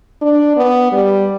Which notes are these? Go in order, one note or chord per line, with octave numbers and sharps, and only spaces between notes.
D4
B3
G3